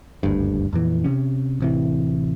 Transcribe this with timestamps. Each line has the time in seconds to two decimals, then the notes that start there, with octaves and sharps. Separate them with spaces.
0.23 F#1 D2 G2
0.73 F2 A#2 E3
1.04 C3 C#4
1.60 A1 C3 E3